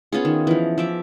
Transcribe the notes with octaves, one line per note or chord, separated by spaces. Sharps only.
B3 C#4 F4 G#4
D#3
E3 F3
F3 E5 D6